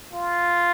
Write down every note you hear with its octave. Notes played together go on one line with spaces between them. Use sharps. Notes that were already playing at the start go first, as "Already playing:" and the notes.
F4